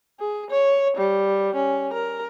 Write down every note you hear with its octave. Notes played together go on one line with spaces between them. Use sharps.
G#4
C#5
G3
C#4
A#4